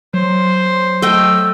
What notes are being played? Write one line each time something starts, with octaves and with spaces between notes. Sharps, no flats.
F#3 C5
A3 D#5 G5 E6